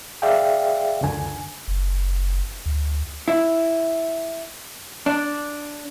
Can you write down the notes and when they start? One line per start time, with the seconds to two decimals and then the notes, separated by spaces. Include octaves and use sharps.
0.22 G#4 D5 E5 F5 G5
1.01 C#2 F#2 D3 G#5
1.68 F#1
2.66 D2
3.28 E4
5.06 D4